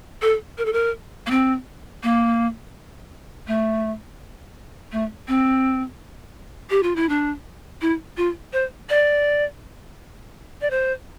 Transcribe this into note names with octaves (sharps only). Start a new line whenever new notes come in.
A4
A#4
A4
A#4
A#3
C4
A#3
A3
A3
C4
G4
F4
E4
D4
E4
F4
C5
D5
D5
C5